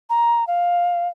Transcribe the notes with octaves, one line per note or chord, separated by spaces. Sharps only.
A#5
F5